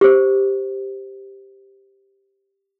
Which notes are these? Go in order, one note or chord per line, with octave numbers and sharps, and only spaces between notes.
G4 C5